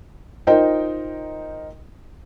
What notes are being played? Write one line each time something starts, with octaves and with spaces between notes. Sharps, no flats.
D#4 F4 A#4 C5 D#5 G5